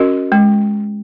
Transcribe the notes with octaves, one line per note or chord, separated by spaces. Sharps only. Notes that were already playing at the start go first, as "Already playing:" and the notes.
Already playing: C#4 F#4 A#4 D#5
G#3